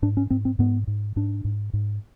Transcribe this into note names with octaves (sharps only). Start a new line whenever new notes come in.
G#2 D4
C#4
G#2 C4
C4
G#2 B3
G#2
G#2 D4
G#2
G#2